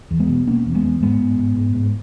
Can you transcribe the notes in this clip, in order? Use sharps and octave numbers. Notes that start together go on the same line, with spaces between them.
E2
G#3 B3
B2
B2 A#3 C#4
E2
G#3 B3
E2
G#2 G#3 B3
G#2
G#2
G#2
G#2